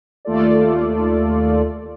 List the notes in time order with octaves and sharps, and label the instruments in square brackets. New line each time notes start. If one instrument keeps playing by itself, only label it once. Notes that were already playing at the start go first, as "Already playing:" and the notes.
[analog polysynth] D#2 A3 F4 A4 D5